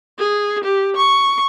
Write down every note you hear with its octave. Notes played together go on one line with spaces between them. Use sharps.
G#4
G4
C#6